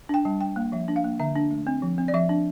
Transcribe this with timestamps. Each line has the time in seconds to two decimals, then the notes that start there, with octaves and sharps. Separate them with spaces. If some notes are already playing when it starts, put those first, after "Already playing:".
0.09 D4 G5
0.25 G3 A5
0.41 D4 G5
0.56 A#3 F5
0.72 F3 E5
0.88 D4
0.96 F5
1.04 A#3
1.20 D3 E5
1.36 D4
1.51 A3
1.67 C4
1.82 F3
1.98 C4
2.08 D5
2.14 F3 E5
2.29 D4